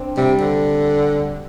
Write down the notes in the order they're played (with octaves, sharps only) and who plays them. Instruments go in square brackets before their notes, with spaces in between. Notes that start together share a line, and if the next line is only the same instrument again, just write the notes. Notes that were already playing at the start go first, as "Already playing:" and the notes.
Already playing: [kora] C4 D4
[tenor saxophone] C3 [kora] G3
[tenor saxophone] D3